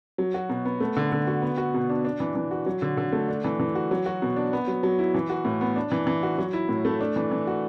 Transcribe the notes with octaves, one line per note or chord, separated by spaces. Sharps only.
F#3
F#4
B2
B3
A3
D3
D3
F#4
B3
F#4
B2
D4
D4
E3
E3
F#4
F#3
D3
D3
A3
D4
E3
E3
F#4
F#3
F#4
B2
D4
B3
F#3
F#3
E4
E3
F#4
A2
B3
D4
E3
E3
F#4
F#3
E4
A2
A3
D4
E3
E3
F#4